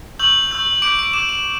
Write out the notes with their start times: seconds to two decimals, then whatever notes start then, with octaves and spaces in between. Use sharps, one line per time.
0.19 C#6 E6 G6 F#7
0.51 C#6 E6 G6
0.82 D6 G6 D7
0.99 D7
1.13 D6 G6 E7
1.29 E7